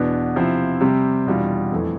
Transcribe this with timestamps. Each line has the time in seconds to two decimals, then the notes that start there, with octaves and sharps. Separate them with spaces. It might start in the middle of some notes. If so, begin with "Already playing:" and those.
Already playing: E2 B2 B3 D4
0.35 C3 F3 C4 E4
0.81 C3 G3 C4
1.26 E2 B2 G3 D4 F4
1.72 F2 E3 A3